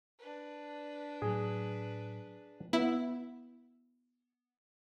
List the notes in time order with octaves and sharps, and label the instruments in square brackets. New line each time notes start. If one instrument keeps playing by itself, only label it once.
[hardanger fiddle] D4 B4
[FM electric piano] A2 F#3 [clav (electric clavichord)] G#4
[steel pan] B3 [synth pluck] E4